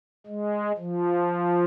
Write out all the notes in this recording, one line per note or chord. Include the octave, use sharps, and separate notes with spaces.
G#3
F3